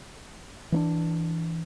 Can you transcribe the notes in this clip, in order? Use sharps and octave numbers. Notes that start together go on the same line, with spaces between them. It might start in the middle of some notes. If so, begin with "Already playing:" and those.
E3 C4 D4